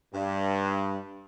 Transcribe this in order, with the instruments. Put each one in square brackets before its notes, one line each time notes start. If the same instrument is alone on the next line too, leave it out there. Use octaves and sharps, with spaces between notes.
[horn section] G2